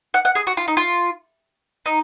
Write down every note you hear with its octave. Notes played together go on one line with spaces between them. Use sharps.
F#5
F#5
G#4
F#4
F4
D#4
F4
D#4